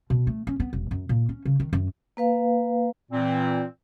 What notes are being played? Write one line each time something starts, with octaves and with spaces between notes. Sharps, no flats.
B2
A3
C#4
B3
E1
F#2
A#2
C#4
C#3
D#3
F#2
A#3 B4 F5
A#2 E3 C4